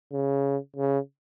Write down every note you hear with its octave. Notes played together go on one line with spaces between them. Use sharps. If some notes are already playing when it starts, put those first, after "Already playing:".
C#3
C#3